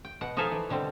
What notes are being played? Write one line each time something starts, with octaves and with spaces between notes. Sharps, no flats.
G5
B2 F#5
F3 D#4 G#4 A4 E5 F5
E3
B2 D3 G3 C4